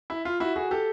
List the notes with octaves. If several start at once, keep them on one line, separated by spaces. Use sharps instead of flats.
E4
F4
E4 F#4
F#4 G#4
G4 A4